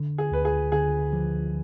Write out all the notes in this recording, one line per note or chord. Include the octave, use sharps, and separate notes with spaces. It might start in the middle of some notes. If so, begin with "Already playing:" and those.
Already playing: D3
G#4
D2 B4
G#4
D3 G#4
F3